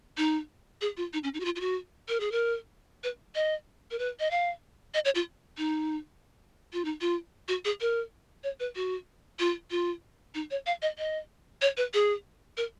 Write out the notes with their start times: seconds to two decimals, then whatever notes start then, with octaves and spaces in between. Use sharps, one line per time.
0.17 D#4
0.81 G#4
0.97 F4
1.13 D#4
1.23 C#4
1.34 D#4
1.40 F#4
1.45 F4
1.56 F4
1.60 F#4
2.08 A#4
2.20 G#4
2.32 A#4
3.03 B4
3.35 D#5
3.91 A#4
3.99 B4
4.20 D#5
4.31 F5
4.94 D#5
5.05 C#5
5.15 F4
5.58 D#4
6.73 F4
6.85 D#4
7.01 F4
7.48 F#4
7.65 G#4
7.81 A#4
8.44 C#5
8.60 B4
8.75 F#4
9.39 F4
9.71 F4
10.34 D#4
10.51 C#5
10.66 F5
10.82 D#5
10.98 D#5
11.61 C#5
11.77 B4
11.94 G#4
12.57 A#4